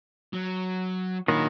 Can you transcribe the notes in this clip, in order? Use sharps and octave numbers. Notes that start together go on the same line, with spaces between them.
F#3
A#2 D#3 F#3 D4 B5